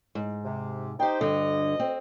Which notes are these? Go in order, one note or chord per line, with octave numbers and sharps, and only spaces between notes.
G#2
C3
D#4 G4 C5 G5
D2 G2 D3 D#5
C4